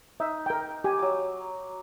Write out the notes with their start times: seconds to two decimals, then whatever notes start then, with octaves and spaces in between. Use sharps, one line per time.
0.20 D#4 E5
0.46 A#4 G5
0.84 G4 G#5
0.99 F#3 D6